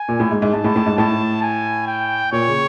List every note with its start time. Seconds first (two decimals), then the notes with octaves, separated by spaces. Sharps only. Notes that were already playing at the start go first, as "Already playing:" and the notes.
Already playing: G#5
0.09 A#2
0.20 A2
0.31 G#2
0.42 G#2
0.53 G#2 A5
0.64 A2
0.76 A2
0.86 G#2
0.98 A2 A5
1.43 G#5
1.87 G5
2.32 A#2 C#5
2.48 C#3